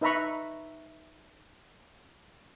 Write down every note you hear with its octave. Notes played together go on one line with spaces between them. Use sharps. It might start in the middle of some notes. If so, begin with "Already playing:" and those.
D#4 B4 E5 A#5 B5 C#6